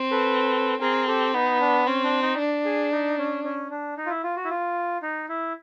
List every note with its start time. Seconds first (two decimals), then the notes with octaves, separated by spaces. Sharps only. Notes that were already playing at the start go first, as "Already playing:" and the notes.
Already playing: C4
0.11 A4 B4
0.81 C4 G#4 A#4
1.07 G4 A4
1.34 B3 D#4
1.60 D4
1.87 C4 C#4
2.04 D4
2.22 D#4
2.39 D4
2.65 G#4
2.92 D#4
3.18 C#4
3.44 C#4
3.71 D4
3.97 D#4
4.06 F4
4.10 E4
4.23 F4
4.36 F#4
4.45 E4
4.50 F4
5.02 D#4
5.29 E4